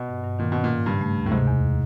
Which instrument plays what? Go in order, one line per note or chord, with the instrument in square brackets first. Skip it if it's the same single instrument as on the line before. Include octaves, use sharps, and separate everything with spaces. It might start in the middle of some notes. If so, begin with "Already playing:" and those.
Already playing: [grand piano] B2
[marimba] G2
G2
[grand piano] A#2 [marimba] D#3
[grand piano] B2 [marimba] C#4
[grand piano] A#2
[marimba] G#2
[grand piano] G2 [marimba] C#3
[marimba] A3
D2
[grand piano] A2
[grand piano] G#2 [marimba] C3
[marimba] E2